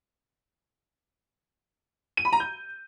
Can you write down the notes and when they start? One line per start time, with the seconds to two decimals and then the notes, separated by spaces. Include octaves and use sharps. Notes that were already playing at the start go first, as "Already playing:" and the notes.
2.17 D#7
2.25 B5
2.33 A#5
2.40 G6